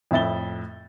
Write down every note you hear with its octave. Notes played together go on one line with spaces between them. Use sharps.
F2 A2 E5 A6 G7